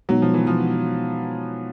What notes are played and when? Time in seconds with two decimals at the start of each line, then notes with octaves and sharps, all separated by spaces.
0.09 B2 F#3 G#3 B3 D#4
0.22 F3
0.34 E3
0.47 F3